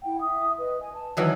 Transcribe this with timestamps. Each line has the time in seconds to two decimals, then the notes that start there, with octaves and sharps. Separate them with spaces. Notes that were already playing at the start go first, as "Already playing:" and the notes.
0.03 E4 F#5 G5
0.22 E5 D#6
0.59 B4 D#5
0.80 G#5
0.94 A5
1.17 D#3 E3 F#3